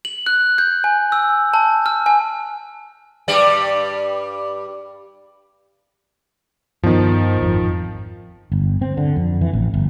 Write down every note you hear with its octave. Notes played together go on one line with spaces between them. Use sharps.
F#7
F#6
G6
G#5
E6
A5
F6
G#5
G2 G3 D5
G2 D#3 F3 B3
G#1 F2
G1
C4
D3
F2
E3
A1
G1